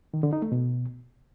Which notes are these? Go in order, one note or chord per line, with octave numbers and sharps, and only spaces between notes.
D#3
D3
D#4
A3
B2